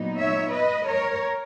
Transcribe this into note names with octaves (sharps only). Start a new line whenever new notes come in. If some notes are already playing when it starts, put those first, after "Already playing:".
Already playing: A#2 F#3 B3 D#4
C#5 E5
B4 D#5
A#4 C#5